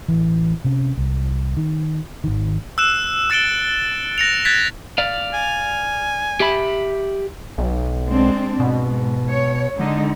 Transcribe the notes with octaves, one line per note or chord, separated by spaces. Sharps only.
A1 E3
C3 C#4
C2
D#3
G#1 D#3
E6 F#6 E7
E6 A6 C#7 D7 E7 G7
F#6 A#6 C#7 F7
F#6 G#6 A6 B6
D5 F5
G#5
G4 E5 B5
B1
G#3 C4 D4
G#2 B2
C#5
D3 G#3 D#4